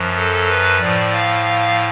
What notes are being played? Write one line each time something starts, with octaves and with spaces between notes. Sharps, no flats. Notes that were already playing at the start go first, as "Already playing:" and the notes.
Already playing: F#2 F3
A4
B4
A2 F3 D5
F5
F5